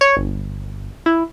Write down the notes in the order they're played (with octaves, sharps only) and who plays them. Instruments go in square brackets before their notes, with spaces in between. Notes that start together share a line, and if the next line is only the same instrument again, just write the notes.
[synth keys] C#5
G1
E4